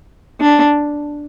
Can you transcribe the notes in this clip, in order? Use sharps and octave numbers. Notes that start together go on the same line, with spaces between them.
D4